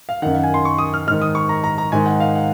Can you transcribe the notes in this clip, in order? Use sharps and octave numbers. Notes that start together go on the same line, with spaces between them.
F5
F#2 D#3 F#5
F5
G#5
C6
C#6
D#6
F6
G#2 D#3 F6
D#6
C#6
A#5
A#5
A#5
G#2 D#3 G#5
F#5
F5
F#5